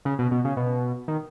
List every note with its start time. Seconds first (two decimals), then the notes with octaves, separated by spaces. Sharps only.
0.05 C#3
0.19 B2
0.31 B2
0.45 C#3
0.57 B2
1.08 D#3